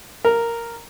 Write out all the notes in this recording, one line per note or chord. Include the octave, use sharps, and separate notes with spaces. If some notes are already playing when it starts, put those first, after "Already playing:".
A#4